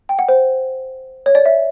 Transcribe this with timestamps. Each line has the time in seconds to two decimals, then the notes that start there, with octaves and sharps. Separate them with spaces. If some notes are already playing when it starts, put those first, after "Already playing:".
0.09 G5
0.19 F#5
0.29 C5
1.26 C#5
1.35 D5
1.45 E5